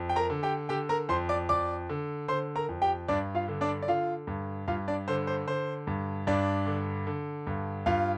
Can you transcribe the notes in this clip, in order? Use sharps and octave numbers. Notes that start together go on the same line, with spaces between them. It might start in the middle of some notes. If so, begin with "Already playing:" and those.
Already playing: F2
G5
A#4 A#5
D3
G4 G5
D3 G4 G5
A#4 A#5
F2 C5 C6
D5 D6
F2 D5 D6
D3
D3 C5 C6
A#4 A#5
F2
G4 G5
G2 D4 D5
F4 F5
D3
D4 D5
D5
D3 F4 F5
G2
G2 F4 F5
D4 D5
D3 C5
C5
D3 C5
G2
G2 D4 D5
D3
D3
G2
G2 F4 F5